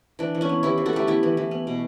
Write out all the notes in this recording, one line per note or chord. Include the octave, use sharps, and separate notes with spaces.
E3 D4
E3
C#4 E4
B3
E3 E4 G4
E3
F#4 A4
A3 E4 G4
B3 E4 G4
E3
E3
B3
B2